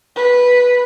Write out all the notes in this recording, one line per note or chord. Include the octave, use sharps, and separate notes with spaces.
B4